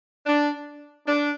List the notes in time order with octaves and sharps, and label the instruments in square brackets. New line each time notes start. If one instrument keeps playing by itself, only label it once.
[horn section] D4
D4